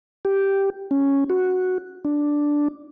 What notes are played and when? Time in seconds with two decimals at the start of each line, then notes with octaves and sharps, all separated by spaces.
0.25 G4
0.91 C#4
1.30 F#4
2.05 D4